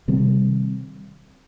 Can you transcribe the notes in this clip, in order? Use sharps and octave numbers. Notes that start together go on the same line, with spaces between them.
C3 D#3 G3 C4